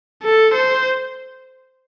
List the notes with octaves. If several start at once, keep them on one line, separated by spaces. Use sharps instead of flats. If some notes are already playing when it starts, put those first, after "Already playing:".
A4
C5